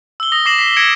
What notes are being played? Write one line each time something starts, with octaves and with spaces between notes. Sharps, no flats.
E6 G7
D#6 A#6 G7
D6 A#6 C7 E7 F#7
B6 C7 E7
G#6 A#6 B6 C#7 D7 E7